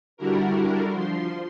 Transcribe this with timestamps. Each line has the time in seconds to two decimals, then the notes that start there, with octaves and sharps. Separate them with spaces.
0.17 D3 G3 D4 E4 F#4 A#4
0.91 F3 C6